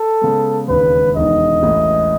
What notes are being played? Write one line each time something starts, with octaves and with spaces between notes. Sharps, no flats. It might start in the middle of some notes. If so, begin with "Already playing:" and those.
Already playing: A4
C#3 G#3 B3
E1 D#2 C#3 B4
E1 E2 D#3 D#5
A1 A2 E3